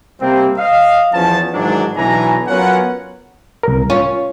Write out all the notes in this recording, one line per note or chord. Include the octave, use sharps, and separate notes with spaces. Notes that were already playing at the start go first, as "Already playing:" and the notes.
C3 G3 A#3 C4
D#5 F5
E2 F3 B3 C#4 A5
G#2 D#3 E3 F#3 D4
B1 B2 E3 D4 G#5 A#5
F#3 B3 C#4 F4 A#4 F#5
C2 A#4
C#4 F4